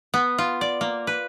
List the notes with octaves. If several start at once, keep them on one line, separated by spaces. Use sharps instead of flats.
B3
F4
D5
A#3
B4